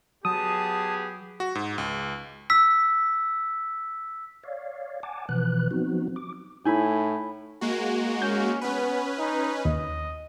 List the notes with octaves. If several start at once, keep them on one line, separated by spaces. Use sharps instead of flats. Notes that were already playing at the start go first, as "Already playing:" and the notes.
F#3 B3 G4 G#4 A5 D#6
F#4
G#2
C#2
E6 B6
C#5 D5 F5
F#5 G#5 A5 D6
B2 E3 F3 B4 F#6
F3 F#3 B3 C4 D#4 F#4
D6
A2 D#4 E4 G#5 B5
G#3 A#3 F#4
C#4 G6
B3 C#4 B4
D#4
D#2 D#5